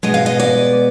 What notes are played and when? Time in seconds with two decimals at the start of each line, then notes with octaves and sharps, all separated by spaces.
0.03 B2 G#3 B3 D#5
0.14 F5
0.26 D#5
0.40 D5